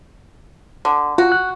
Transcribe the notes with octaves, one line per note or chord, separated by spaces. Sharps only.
D3
F4 F#4
F#6